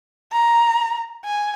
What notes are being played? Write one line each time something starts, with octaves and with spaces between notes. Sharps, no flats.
A#5
G#5